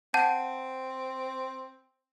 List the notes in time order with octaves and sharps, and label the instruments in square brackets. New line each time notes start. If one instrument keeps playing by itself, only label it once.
[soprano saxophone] C4 [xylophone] F#5 A5 G6